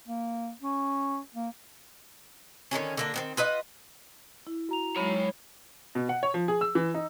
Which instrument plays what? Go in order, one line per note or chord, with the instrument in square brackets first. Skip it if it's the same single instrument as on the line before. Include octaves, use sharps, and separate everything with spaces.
[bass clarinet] A#3
C#4
A#3
[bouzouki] D3 D#3 F#3 C#4
D3 A#3 D4
D#3 B3 C4
F4 B4 D#5 F#5
[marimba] E4
[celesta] F#4 A#5 F7
[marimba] F#3 G#3 [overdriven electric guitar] C#5 B5
[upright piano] B2
F#5
C#5
F3
G#4
E6
E3
D#4